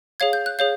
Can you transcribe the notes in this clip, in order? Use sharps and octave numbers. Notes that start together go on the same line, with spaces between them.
G#4 C#5 F5 G#6
G6
F#6
G#4 C#5 F5 G6